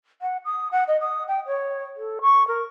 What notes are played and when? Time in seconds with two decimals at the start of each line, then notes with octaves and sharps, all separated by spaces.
0.21 F#5
0.45 D#6
0.71 F#5
0.88 D#5
1.01 D#6
1.28 G5
1.46 C#5
1.97 A4
2.21 C#6
2.47 A#4